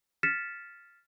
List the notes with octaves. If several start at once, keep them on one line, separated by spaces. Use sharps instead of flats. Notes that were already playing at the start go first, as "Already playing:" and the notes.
F6 A6 B6 C#7 E7